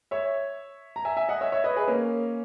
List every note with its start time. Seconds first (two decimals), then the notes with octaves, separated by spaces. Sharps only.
0.11 C#5 E5
0.96 A#5
1.05 E5 G#5
1.17 E5 G#5
1.29 D#5 F#5
1.41 C#5 E5
1.52 C#5 E5
1.64 B4 D#5
1.76 G#4 B4
1.88 A#3 C#4